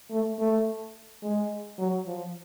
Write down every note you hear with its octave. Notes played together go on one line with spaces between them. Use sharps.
A3
A3
G#3
F#3
F3